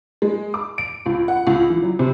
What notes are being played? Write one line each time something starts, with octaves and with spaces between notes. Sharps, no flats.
G#3
D6
D7
C#2
F#5
C#2
E3
F#3
C3